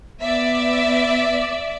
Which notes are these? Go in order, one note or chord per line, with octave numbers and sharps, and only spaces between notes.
B3 D5 E5